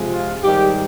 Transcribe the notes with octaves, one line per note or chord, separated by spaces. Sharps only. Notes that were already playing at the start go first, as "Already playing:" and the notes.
Already playing: C3 F3 G#3
F4
G#2 D#3 G3 G4